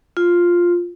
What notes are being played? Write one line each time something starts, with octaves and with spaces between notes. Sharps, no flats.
F4